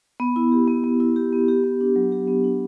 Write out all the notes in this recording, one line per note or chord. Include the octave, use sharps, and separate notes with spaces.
B3
E4
G4
B3
B3
E4
G4
B3
G4
B3
D4
F#3
G4
B3
D4